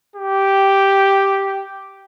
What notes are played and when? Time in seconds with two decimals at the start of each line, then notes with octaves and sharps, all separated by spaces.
0.16 G4